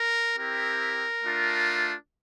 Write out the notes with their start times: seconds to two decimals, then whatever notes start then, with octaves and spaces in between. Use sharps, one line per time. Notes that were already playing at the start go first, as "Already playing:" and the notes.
Already playing: A#4
0.37 C4 E4 G4 A#4
1.24 A3 D4 F4